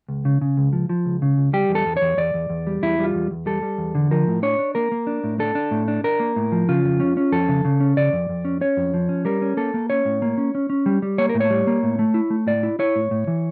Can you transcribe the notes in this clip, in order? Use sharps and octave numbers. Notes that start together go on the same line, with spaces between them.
C#2
C#3
C#3
C#2
F3
F3
C#2
C#3
C#2
G3 G4
E2
A4
E2
E2 C#5
E2 D5
E2
E2
G3
E2 E4
G3
F4
E2
E2
G3 A4
G3
E2
D3
F3 A#4
A2
D4 C#5
D4
A#3 A#4
A#3
D4
A2
D4 A4
D4
A2
D4
D4 A#4
A#3
A2
F3
C#3 F4
F2
C#4
C#4
F2 A4
C#3
C#3
C#4
C#3 D5
F2
F2
C#4
C#4 C#5
F2
F3
C#4
G3 A#4
C#4
A#3 A4
A#3
C#4 C#5
A2
A#3
C#4
C#4
C#4
G3
G3
A#3 C#5
A#4
A2
C#5
G3
A#3
A2
A3
E4
A3
A2 D5
E4
E4 C#5
A2
A2
E3